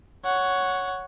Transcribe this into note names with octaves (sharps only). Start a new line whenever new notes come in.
C#5 F#5